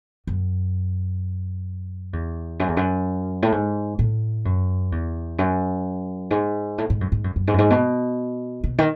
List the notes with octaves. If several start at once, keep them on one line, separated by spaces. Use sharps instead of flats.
F#2
E2
F#2
E2
F#2
A2
G#2
A2
F#2
E2
F#2
G#2
A2
G#2
F#2
G#2
F#2
F#2
G#2
F#2
G#2
B2
B2
D#3